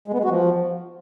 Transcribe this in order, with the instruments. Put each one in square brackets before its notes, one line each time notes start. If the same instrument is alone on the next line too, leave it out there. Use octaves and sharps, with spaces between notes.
[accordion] G#3
B3
G#3
F#4
F3